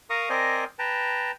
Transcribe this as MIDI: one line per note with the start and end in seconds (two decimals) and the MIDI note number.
0.10 0.29 70
0.10 0.29 77
0.10 0.29 82
0.10 0.29 85
0.10 0.29 87
0.30 0.64 60
0.30 0.64 70
0.30 0.64 72
0.30 0.64 74
0.30 0.64 75
0.30 0.64 80
0.79 1.31 71
0.79 1.31 79
0.79 1.31 81
0.79 1.31 82